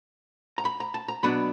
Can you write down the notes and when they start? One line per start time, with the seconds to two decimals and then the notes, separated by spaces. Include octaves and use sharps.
0.58 A#5
0.65 B5
0.80 A#5
0.94 A5
1.08 A#5
1.23 B2 F#3 B3 D4 B5